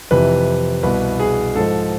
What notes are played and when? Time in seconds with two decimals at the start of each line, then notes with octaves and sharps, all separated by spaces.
0.11 F2 C3 E3 B4
0.83 C2 B2 B4
1.20 G#4
1.56 G#2 F3 A4